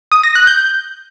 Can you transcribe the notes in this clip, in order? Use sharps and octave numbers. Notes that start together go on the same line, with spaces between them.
D#6
A#6
F#6
G6